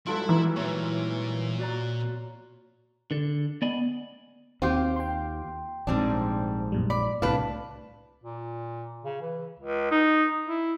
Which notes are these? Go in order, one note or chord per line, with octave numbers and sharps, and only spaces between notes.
G#2 F#3 G3 E4 F4 A4 B4 E5
E3 A#4
A#2 C#5
F#4 D5 A#5
D3 A4
B3 D5 D#5 G#5 B5
D#2 C4 F4 G4 C6
G5 C6
A#1 G#2 G3 C4 D4
F#2 A#2 G3
D5 B5
C2 A2 C3 D4 B4 F5
A#2
C#3
E3
C#2
D#4
E4